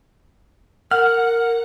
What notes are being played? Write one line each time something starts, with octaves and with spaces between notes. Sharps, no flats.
A#4 F#5 F6